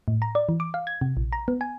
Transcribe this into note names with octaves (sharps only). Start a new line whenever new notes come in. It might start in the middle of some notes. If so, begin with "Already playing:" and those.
A2
A#5
D5
E3
D6
F5
G#6
C3
A#1
A#5
B3
G#5